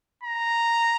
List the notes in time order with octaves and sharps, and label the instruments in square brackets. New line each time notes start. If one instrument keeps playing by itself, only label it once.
[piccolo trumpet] A#5